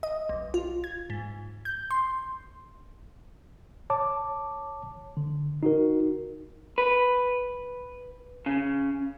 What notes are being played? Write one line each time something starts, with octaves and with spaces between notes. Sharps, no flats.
D#5
B1
F4
G#6
G#2
G6
C6
C#5 A5 D6
D3
D#4 F#4 A#4
B4
C#3